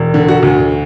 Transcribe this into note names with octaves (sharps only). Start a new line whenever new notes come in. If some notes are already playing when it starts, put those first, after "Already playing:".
Already playing: E1
D3
F#4
D2